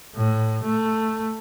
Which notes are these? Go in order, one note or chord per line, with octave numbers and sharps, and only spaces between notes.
A2
A3